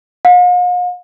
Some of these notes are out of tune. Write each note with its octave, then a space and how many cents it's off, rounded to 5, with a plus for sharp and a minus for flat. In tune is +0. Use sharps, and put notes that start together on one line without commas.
F5 +45